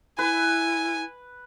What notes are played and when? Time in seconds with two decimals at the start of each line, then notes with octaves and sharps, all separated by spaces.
0.19 E4 B4 G#5